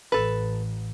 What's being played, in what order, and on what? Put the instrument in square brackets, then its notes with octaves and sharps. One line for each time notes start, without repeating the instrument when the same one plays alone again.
[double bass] A1 [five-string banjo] A4 B4